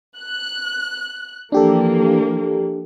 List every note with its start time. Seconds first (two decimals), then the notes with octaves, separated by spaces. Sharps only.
0.16 F#6
1.52 E3 F3 A#3 D4 G4 A4